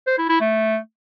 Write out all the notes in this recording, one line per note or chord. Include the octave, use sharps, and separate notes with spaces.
C5
E4
E4
A3